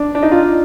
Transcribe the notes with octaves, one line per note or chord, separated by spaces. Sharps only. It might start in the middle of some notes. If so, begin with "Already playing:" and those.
Already playing: D4
D4
D#4
F4